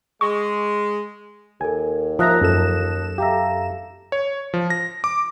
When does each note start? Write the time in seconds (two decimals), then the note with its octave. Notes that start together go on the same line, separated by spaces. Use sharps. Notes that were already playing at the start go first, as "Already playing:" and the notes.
0.21 G#3 C#6
1.61 D#2 A4 A#4 G#5
2.19 F3 A#4 E5 A#5 D#6 F#6 A#6
2.41 F#2 A4 E7
3.18 G4 E5 F5 A#5 A#6
4.12 C#5
4.54 F3
4.70 A#6
5.04 D6